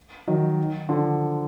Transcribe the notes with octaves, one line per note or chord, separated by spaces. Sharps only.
D#3 F#3
D3 F3